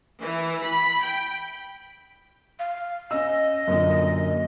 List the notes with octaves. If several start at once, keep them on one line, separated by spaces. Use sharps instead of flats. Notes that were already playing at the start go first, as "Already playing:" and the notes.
E3
B5
G5
F5
C#4 D#5 E6
F#2 A#2 D3